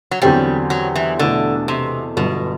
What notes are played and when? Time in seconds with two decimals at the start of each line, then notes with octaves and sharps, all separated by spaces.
0.11 F#3
0.22 E2 D3 F#3 G3 C4 G4
0.70 F#3
0.96 E3
1.19 E2 B2 D3 A3 E4 A4
1.68 C3
2.16 G1 G2 B2 D3 F#3